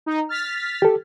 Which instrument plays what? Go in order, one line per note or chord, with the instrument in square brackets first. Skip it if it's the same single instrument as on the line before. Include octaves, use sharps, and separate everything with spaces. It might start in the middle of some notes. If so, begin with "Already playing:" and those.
[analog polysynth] D#4
F6 A6 B6
[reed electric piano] G4 A4